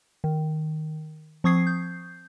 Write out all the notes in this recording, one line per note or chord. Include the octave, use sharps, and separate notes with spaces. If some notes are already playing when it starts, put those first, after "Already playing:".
D#3
F3 C4 C#6 D#6 G#6 C7
G6